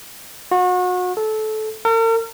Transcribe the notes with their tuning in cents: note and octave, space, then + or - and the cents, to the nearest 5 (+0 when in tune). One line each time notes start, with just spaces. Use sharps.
F#4 -35
A4 -20
A#4 -45